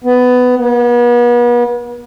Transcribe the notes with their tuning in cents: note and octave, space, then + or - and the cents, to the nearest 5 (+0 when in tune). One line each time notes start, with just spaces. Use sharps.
B3 +15
B3 -40